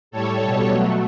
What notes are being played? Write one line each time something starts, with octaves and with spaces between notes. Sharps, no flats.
A2 G3 A4 C#5
B2 G3
B2 F#3 A3